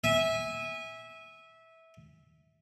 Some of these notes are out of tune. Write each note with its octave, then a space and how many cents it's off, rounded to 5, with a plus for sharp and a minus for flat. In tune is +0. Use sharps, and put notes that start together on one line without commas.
E5 -15 G#5 -20